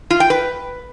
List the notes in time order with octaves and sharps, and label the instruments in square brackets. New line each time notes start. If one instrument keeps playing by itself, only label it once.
[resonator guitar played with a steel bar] F4
G5
B4